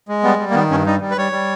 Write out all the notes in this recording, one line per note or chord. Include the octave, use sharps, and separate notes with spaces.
G#3
G3 B3
G3
A#3
D#3 B3
G2 C#4
G3 D#4
G3
B4
G3 C#5
G3